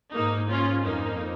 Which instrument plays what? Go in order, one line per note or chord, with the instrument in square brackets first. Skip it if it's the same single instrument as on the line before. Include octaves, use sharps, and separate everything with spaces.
[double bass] G#2 [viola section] A#3 D#4
[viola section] C#4 F4
[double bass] F2 [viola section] A#3 D#4